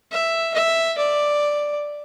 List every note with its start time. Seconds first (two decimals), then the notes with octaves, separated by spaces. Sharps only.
0.12 E5
0.54 E5
0.98 D5